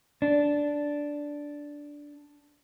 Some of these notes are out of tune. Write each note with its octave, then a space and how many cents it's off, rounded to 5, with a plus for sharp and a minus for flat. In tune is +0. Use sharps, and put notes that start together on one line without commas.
D4 -5